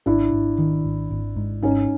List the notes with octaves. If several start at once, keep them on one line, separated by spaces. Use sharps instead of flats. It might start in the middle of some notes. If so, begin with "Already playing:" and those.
G#1 D4 E4
G#1
D#3
G#1
G#1
G#2
G#1 C#4 D#4